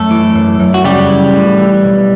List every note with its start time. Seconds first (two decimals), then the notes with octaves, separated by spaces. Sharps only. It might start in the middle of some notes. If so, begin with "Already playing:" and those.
Already playing: F#2 A3 A4
0.11 E3
0.35 F#2
0.60 F#2
0.74 F#4
0.84 C#3 G3 G4
1.09 E3
1.34 A2
1.59 E3
1.83 B1